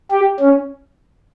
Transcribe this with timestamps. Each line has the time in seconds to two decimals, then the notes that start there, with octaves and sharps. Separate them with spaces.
0.11 G4
0.40 C#4